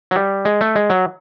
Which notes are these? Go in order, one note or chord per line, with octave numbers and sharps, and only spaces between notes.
F#3
G3
G#3
A3
G#3
F#3